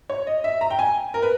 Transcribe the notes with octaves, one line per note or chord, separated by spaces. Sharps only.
C#5
D#5
E5
A#5
G5
G#5
A#4
B4